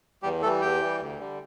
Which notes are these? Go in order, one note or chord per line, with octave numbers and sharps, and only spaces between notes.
E2 G3 G4
E3 G3 A3 A4
E2 G4 G5
E3 G3
D2
D3 G3